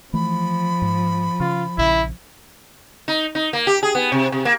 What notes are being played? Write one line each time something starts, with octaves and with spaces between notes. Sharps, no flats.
E3 F3 A3 B5
G#2
C#3 F4
A#1 C#3 E4
D#4
D#4
A#3
G4
G#4
B3
C3
C3
A#3